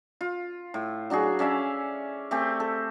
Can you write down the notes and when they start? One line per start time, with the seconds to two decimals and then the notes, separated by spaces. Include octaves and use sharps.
0.21 F4
0.74 A2
1.10 F#3 D4 F#4 G#4
1.39 C#4 D5 E5 F5
2.31 A3 C4 G4 G#5
2.60 A4